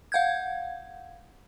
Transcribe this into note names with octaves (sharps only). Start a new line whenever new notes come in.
F5 F#5 G6 G#6